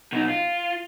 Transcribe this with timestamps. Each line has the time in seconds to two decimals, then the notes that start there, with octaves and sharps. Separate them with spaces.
0.12 B2 D#4
0.30 F4